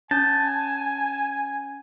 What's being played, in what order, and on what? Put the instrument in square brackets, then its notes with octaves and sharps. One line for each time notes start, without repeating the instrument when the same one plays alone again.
[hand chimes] C#4 G6 [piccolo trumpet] G#5 [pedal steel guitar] A5